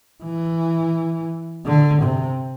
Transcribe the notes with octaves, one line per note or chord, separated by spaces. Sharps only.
E3
D3
C3